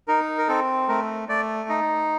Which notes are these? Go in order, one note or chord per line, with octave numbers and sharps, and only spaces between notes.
D#4 A#4
A#4
C4 A4
A3 A#4
A3 D5
D#4 D#5